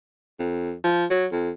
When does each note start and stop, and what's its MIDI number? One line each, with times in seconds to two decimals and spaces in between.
0.40 0.73 41
0.84 1.05 53
1.10 1.26 54
1.32 1.50 41